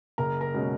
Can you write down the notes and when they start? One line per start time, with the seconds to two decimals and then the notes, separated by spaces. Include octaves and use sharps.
0.18 F#1 A#4 A#5
0.41 A#4 A#5
0.54 B2 G#3 C#4